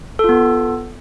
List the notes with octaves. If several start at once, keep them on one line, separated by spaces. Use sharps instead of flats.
B3 F4 A4